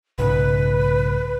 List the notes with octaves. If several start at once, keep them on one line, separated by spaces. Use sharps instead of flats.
B1 G#2 C#3 B4